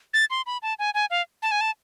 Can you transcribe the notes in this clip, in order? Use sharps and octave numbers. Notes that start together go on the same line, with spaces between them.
A6
C6
B5
A5
G#5
G#5
F5
A5
G#5
A5